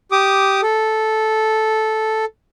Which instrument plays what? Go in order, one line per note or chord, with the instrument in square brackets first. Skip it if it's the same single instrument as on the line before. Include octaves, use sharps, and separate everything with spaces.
[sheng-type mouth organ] G4 D6 D#6
A4